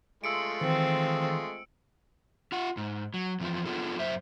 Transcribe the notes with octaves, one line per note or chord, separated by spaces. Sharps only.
G#3 A3 F4 E6 C#7 D7
D#3 E3 C4
F4 F#5
G#2
F#3
F2 E3 F3
B3 D4 F4 G#4 A4
F#2 C5 E5